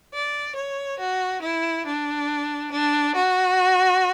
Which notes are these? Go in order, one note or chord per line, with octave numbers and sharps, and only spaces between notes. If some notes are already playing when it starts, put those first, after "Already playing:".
D5
C#5
F#4
E4
D4
D4
F#4